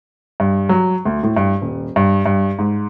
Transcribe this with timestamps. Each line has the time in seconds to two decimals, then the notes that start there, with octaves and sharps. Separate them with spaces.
0.40 G2
0.69 F#3
1.05 D2
1.23 A2
1.37 G2
1.62 D#1
1.96 G2
2.26 G2
2.59 G#2